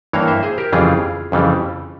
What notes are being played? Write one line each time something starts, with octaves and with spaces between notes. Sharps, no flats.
G2 E3 A#3 C#5 F5
C5 E5
G#4 C5
G4 A#4
F2 C#3 E3 G3 F4 G#4
F2 C#3 E3 G3